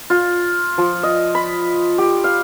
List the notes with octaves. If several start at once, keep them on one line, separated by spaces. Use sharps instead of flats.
F4
F3
D#5
B5
G4
F5